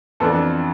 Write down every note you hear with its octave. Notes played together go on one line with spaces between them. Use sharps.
F2 E3 B3 D4 A4